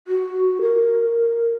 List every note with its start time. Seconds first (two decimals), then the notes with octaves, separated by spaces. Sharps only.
0.08 F#4
0.62 A#4